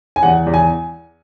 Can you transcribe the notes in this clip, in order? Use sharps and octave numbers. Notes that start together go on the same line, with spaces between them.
G#5
E2 F#5
E2
G#5